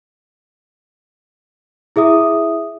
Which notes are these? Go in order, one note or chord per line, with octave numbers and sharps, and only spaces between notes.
E4 G#4 E5 D#6